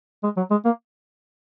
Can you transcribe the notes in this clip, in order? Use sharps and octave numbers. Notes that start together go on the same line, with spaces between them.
G#3
F#3
G#3
A#3